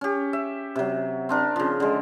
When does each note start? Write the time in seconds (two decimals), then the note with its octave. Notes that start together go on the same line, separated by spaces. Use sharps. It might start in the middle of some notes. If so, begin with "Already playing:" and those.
0.01 C#4 G4
0.33 E5
0.76 C3 F#3
1.29 C4 D4 A#4
1.56 C#3 F3
1.80 D3 G#3